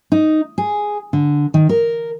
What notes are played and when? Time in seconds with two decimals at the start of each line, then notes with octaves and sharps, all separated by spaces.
0.12 D#4
0.58 G#4
1.13 D3
1.54 D#3
1.69 A#4